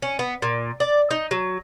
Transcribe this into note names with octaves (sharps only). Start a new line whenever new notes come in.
C#4
B3
A#2
D5
D#4
F#3